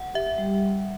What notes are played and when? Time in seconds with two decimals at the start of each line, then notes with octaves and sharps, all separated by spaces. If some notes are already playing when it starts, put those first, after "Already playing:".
Already playing: F#5
0.14 G4 E5
0.38 G3